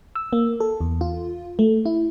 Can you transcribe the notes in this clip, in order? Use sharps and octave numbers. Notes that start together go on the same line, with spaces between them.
E6
A#3
A4
E2
F4
A3
E4